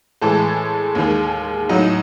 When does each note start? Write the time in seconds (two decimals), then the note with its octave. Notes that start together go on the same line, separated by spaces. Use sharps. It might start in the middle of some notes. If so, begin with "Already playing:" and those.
0.22 A2 E3 G#3 A4
0.95 D#2 D#3 G#3
1.69 A2 F#3 D#4